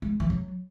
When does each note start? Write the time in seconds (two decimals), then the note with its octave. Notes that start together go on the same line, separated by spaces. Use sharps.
0.02 G#3
0.20 E3
0.30 F#3